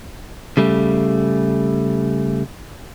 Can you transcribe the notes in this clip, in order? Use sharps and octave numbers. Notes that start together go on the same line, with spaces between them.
C#3 G3 A3